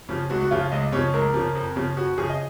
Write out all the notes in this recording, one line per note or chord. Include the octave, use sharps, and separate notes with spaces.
C#3 F3
C#2 F#4
F#4
C#3 F3 F4
C#2 D#5
C#3 F3 C#5
C#2 A#4
C#3 F3
F2
C#3 F3
F2 F#4
C#3 F3 G#4
D#5